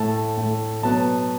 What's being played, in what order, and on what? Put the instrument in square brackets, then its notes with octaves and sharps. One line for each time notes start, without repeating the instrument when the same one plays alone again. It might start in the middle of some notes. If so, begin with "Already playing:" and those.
Already playing: [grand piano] A2 A3 A5
A2 A3
B2 F#3 B3 A5